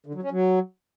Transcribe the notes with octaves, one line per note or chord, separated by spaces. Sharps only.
D3
F#3
C#4
F#3